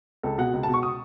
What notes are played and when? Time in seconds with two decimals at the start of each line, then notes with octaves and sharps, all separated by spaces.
0.23 C#2 A4
0.38 B2 F#5
0.54 C#2
0.63 A5
0.68 B2
0.74 C#6
0.83 D#6